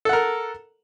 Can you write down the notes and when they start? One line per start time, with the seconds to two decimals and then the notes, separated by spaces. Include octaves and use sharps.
0.05 A4
0.09 F#5
0.13 A#4